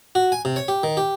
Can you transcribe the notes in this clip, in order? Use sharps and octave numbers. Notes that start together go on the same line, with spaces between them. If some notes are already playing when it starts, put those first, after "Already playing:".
F#4
G#5
C3
C#5
G4
D#3
G4